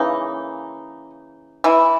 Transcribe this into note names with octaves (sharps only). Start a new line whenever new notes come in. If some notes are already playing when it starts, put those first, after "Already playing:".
Already playing: C#3 E3 A#3 D#4
E3 E4